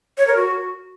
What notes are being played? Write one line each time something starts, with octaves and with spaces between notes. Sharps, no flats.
C#5
A#4
F#4